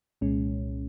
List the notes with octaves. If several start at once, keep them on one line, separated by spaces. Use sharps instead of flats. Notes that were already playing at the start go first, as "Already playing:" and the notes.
C2 A#2 G#3 C#4